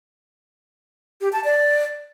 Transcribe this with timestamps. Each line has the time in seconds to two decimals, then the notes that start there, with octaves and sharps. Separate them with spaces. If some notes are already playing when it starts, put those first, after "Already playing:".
1.21 G4
1.33 A5
1.44 D5